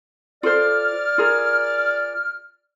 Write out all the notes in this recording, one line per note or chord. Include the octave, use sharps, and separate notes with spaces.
F4 A4 C5 D5 F6
F4 G#4 A#4